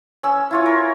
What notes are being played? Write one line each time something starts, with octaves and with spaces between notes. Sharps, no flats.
C#4 E6
E4 F4 C#5
A#4